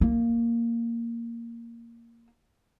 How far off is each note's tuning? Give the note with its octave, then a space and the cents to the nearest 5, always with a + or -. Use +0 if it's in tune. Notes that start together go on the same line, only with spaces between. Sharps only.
A#3 -5